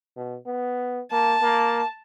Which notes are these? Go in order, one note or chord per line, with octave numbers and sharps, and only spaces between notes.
B2
B3
A#3 A5
A#3